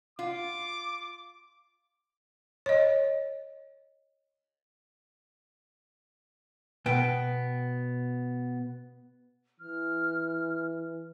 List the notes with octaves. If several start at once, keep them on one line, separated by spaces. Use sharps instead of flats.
F4 D6
C#5 D#5
B2 B3 G5
E3 F6